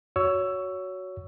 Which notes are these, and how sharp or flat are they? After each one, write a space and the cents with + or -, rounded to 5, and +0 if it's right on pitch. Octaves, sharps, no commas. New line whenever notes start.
F#4 +0 C#5 +15 E6 +10